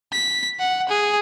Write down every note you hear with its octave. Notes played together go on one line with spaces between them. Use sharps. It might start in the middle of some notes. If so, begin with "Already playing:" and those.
B6
F#5
G#4